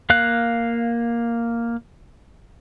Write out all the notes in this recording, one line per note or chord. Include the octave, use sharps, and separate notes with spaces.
A#3 F5 F#6